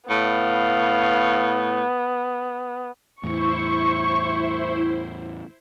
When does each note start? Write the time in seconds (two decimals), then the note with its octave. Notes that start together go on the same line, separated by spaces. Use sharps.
0.10 A2 B3 F5
3.23 E2 A2 E4 C5 C#6